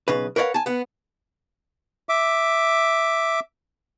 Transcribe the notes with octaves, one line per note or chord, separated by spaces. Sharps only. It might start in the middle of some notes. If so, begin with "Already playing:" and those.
B1 C#3 B4
A#4 B4 C#5 D5 F5 F#5
G#5 A5
B3 F#5
E5 D6